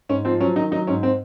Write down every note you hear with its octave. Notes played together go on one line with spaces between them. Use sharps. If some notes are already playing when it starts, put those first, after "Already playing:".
G#2 C#4
F3 C4
F#3 C#4
D#3 D#4
F#3 D#4
G#2 C#4
C4